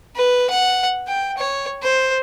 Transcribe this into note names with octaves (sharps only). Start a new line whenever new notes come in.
B4
F#5
G5
C#5
C5